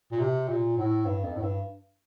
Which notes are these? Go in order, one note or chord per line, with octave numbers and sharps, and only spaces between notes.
A#2
C3
A#2
A2
G2
F2
A2
G2